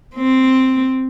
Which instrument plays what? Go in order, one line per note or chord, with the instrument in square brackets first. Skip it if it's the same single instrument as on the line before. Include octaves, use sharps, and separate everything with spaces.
[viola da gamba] C4